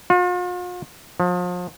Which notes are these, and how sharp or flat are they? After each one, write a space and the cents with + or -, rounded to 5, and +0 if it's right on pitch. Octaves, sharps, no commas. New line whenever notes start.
F4 +45
F3 +35